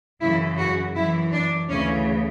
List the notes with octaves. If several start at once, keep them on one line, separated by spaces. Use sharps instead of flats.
F#2 C#3 E3 E4
F#4
F#2 E3 E4
D4
D2 C#3 E3 C#4